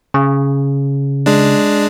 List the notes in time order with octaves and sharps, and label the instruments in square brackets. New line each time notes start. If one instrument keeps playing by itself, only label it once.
[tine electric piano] C#3
[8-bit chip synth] G#3 D4